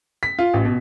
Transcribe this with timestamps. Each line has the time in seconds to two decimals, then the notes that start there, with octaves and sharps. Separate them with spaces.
0.23 B6
0.39 F4
0.54 A1
0.65 B2